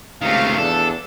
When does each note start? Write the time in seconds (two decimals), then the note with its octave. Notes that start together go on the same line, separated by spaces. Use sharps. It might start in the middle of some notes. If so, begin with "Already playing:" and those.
0.22 C#2 C3 D#3 A3 F5
0.58 E2 D4 A4